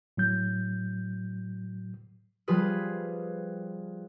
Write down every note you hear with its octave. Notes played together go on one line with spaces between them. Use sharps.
A2 F#3 G6
F3 G3 F4 G#4 B4